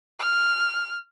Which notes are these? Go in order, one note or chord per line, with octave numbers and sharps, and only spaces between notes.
F6